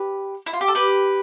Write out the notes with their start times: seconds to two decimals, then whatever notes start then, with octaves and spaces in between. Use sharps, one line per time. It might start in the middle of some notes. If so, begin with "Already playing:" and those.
Already playing: G4 B4
0.46 E4
0.53 F4
0.61 G4
0.68 A4
0.75 G4 B4